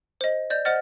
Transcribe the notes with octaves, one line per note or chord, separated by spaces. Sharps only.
C5 D#5
D5 D#5 G6
C5 D#5 F#5 F6 A6